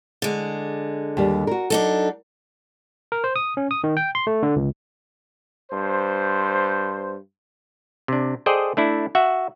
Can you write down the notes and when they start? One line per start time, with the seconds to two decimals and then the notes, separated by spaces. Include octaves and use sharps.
0.22 D3 G#3
1.17 D#2 G3
1.47 F#4 A#4
1.70 F#3 D4 D#4 A4
3.12 A#4
3.24 C5
3.36 D#6
3.57 C#4
3.71 D#6
3.84 D#3
3.97 G5
4.15 C6
4.27 A3
4.43 D3
4.56 C#2
5.72 G2 C5
8.08 C3 D4
8.46 G#4 A4 C5 D5 D#5 G5
8.77 A3 D4 E4
9.15 F#4 E5 F#5